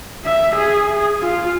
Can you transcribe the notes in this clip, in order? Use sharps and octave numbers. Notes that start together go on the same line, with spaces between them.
E5
G#4
F4